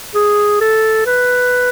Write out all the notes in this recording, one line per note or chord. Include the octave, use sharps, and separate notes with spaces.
G#4
A4
B4